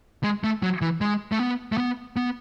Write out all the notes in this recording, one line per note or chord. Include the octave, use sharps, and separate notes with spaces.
G#3
A3
F#3
E3
G#3
A3
B3
A3
B3
B3